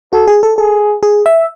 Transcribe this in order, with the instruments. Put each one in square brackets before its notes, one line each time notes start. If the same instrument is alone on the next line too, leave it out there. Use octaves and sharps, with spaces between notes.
[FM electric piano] F#4 [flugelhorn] A4
[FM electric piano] G#4
A4
[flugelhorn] G#4 [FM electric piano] A4
[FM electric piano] G#4
E5